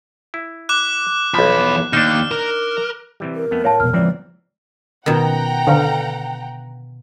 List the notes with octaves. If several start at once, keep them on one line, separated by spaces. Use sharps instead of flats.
E4
D6 F#6
B1 E2 F3 B5
D#2 D4 D#4 F6
A#4
C3 E3 G3
A#4
F2 A3 B3
A2 C#5 F5 A5
E1 B2 F6
E3 F3 G#3 C4 D5
B2 D#3 C#4 F4 F#5 G5 A#5
D3 B4 F5 G#5